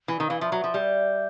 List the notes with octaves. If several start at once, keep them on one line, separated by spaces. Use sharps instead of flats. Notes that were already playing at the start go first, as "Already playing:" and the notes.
E3
D#3
E3 F5
F3 E5
F#3
F3
G3